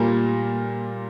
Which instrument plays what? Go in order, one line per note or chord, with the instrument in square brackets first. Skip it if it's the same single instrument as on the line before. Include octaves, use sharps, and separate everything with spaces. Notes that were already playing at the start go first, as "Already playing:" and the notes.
Already playing: [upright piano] A#2 G3 A#3 F4 A#4